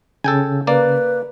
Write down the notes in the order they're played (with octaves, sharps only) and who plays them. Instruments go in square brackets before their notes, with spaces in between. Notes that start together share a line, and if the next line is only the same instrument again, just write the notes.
[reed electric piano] C#3 [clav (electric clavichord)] A4 G5 G#5
[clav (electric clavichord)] A#3 D5 [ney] B4